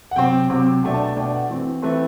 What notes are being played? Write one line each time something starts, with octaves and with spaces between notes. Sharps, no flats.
F#5
C3 F#3 C4 G5
C3 F#3 C4
B2 A3 D4 G5
A5
A5
B2 A3 D4 G5
F#5
E3 A3 C4
E3 A3 C4 B4